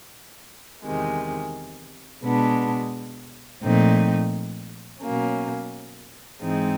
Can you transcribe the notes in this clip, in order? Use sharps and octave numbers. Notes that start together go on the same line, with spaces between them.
E2 C3 D#3 G#3
B2 G#3 B3 D4
A#2 F3 A3 C4 D#4
B2 F#3 A#3 C#4
G#2 E3 G#3 C4 D#4